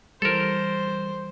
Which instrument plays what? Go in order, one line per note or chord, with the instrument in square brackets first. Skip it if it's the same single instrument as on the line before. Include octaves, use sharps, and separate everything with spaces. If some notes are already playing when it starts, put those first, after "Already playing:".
[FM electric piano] E3 G3 [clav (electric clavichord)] A4 A#4 [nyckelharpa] C5